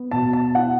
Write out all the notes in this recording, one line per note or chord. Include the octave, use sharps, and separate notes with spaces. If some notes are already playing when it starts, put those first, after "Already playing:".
Already playing: B3
B2 A5
A5
E4 F#5